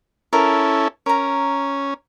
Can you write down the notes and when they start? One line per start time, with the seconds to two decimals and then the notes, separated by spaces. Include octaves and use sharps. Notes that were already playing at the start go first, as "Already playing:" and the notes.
0.33 C#4 E4 A4 A#4
1.06 C#4 A#4 A#5